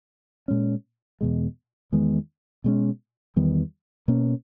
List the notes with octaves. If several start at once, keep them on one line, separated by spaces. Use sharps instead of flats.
A#2 G#3 C#4
E2 B2 G#3
E2 D#3 G#3 B3
B2 G#3 C#4
E2 D#3 G3 B3
B2 A#3 C#4